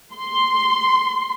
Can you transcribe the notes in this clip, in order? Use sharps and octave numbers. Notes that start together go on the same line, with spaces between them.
C6